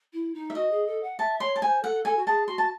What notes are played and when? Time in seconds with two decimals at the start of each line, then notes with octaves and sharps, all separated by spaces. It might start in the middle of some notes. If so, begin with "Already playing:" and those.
0.13 E4
0.34 D#4
0.50 E5
0.55 F#4 D#5
0.71 G#4
0.87 A4
1.03 F#5
1.19 E5 A5
1.40 C#5 C6
1.56 A5
1.62 C5 G#5
1.83 A4 F#5
2.05 A4 G#5
2.17 F#4
2.27 G#4 A5
2.48 F#4 C6
2.58 A5